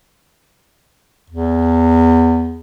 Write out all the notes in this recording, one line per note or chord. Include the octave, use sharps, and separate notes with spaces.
E2